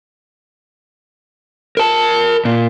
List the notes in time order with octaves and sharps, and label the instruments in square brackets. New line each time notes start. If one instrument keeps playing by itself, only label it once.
[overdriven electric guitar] A#4 A5
A#2